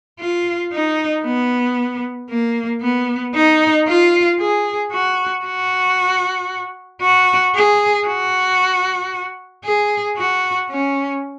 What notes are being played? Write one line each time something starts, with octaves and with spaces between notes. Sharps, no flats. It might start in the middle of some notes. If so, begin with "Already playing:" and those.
F4
D#4
B3
A#3
B3
D#4
F4
G#4
F#4
F#4
F#4
G#4
F#4
G#4
F#4
C#4